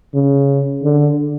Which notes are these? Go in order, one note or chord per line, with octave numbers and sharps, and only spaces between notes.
C#3
D3